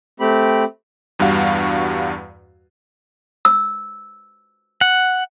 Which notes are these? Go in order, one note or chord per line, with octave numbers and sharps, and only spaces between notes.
A3 C4 G4 B5
E2 G2 G3 F#4 F5 F#5
E6
F#5